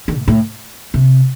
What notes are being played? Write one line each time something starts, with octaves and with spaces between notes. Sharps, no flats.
D#3
A2
A2
C3